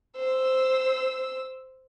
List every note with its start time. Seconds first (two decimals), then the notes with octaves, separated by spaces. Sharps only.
0.16 C5 E6